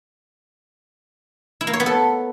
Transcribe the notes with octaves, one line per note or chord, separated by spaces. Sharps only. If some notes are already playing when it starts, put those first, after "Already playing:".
E4
A#3
C#5
B3
A4